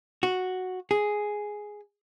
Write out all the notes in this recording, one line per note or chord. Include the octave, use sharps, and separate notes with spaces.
F#4
G#4